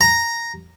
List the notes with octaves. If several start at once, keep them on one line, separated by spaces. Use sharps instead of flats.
A#5